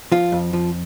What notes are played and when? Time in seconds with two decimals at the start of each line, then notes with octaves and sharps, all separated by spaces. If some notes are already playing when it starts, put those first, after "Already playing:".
0.12 F3 F4
0.32 F2
0.53 F3